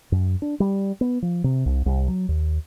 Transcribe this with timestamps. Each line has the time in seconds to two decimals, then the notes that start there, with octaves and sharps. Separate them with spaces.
0.12 F#2
0.42 D4
0.60 G3
1.01 B3
1.22 F3
1.44 C3
1.66 C2
1.86 C2
2.08 F#3
2.29 D#2